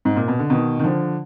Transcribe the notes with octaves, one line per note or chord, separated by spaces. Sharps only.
G#2
A#2
B2
D3
B2 D#3
D#3
D3 F3